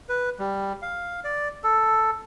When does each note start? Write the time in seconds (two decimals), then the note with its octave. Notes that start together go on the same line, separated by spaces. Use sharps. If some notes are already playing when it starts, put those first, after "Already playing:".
0.09 B4
0.39 G3
0.82 F5
1.24 D5
1.64 A4